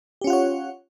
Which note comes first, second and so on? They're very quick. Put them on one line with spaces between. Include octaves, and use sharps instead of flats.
G4 C#4 F4 F#5 C#5